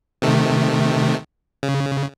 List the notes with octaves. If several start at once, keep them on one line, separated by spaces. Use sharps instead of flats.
C3 D#3 A3
C#3